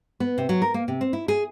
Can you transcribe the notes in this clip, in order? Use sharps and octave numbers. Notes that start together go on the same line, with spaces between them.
B3
C3
F#3
A#4
A#3
C3
C4
E4
G#4